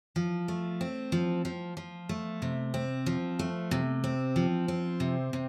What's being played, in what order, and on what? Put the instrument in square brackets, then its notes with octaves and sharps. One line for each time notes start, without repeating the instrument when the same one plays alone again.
[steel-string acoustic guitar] F3
A3
C4
F3
F3
F3
A3
C3
C4
F3
A3
C3
C4
F3
C4
C3
C3